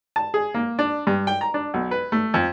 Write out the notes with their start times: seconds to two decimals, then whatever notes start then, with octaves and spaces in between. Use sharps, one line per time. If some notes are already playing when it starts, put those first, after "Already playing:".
0.16 A5
0.34 G#4
0.54 A#3
0.79 D4
1.07 G2
1.27 G5
1.41 A#5
1.54 D4
1.74 B1
1.91 B4
2.12 A3
2.34 F2